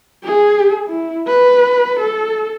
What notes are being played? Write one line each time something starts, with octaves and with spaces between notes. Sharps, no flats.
G#4
E4
B4
A4